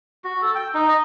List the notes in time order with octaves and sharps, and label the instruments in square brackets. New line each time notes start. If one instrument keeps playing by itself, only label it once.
[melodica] F#4
A4
G5
D#4
D#5